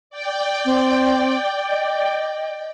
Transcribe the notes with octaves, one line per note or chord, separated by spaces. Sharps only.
D5 G5
C4
D#5